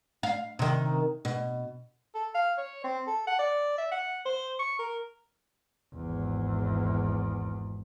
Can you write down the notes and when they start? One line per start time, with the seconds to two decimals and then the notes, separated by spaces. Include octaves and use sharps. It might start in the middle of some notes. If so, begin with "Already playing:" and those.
0.23 F5
0.59 C3 D#3
1.25 B2
2.14 A4
2.35 F5
2.58 C#5
2.84 C4
3.07 A4
3.27 F#5
3.39 D5
3.78 E5
3.91 F#5
4.26 C5
4.59 C#6
4.79 A#4
5.94 G#1 E2